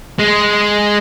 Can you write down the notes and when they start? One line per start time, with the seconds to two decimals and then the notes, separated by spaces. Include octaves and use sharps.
0.19 G#3